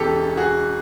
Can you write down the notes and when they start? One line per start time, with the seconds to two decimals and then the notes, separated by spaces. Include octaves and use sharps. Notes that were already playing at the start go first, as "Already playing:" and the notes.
Already playing: E1 E2 C#3 E3 G4 A4
0.37 F#4 G#4